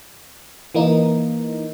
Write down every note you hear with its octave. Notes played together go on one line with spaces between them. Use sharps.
E3 A#3 D#4